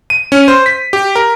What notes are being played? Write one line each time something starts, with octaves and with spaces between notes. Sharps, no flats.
D#7
C#4
C5
B6
G4
A#4